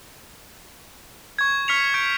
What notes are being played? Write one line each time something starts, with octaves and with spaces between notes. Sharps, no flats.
C#6 G#6
C#6 F6 B6 C#7 F7
C#6 G6 G#6 D7